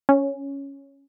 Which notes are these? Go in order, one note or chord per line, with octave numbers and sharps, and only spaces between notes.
C#4